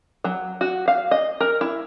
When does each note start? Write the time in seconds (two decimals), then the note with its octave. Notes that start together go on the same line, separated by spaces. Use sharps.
0.24 F#3
0.61 F#4
0.88 F5
1.11 D#5
1.40 A#4
1.61 E4